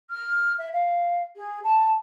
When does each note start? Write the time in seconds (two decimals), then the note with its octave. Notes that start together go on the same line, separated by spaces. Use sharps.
0.09 F6
0.58 E5
0.73 F5
1.35 G#4
1.63 A5